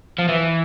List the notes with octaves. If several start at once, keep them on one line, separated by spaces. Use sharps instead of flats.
F3
E3